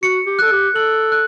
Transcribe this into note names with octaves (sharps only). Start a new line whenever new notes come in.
F#4 C#7
G4
A4 F#6
G4
A4 F#7
F#6